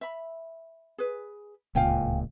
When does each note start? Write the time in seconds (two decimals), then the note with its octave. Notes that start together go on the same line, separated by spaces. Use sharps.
0.01 E5 B5
0.98 G#4 B4
1.75 D1 C#2 A#2 F5 G5 G#5